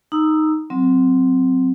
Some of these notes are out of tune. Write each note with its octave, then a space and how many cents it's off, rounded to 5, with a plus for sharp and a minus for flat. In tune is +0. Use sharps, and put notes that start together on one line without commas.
D#4 +0 A#5 +0 E6 +0
F#3 +0 C4 -5